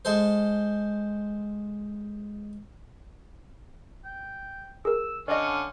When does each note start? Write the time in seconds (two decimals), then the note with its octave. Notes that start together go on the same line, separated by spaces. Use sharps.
0.05 G#3 A4 C5
4.05 G5
4.85 G#4 A#4 E6
5.28 D3 C#4 D5 D#5 F5